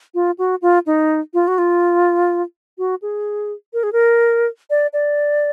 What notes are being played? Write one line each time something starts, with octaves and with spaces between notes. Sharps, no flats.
F4
F#4
F4
D#4
F4
F#4
F4
F#4
G#4
A#4
G#4
A#4
D5
D5